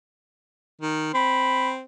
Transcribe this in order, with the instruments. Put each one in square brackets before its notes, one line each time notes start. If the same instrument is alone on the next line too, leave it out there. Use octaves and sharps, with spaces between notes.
[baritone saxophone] D#3
[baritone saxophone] C4 [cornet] B5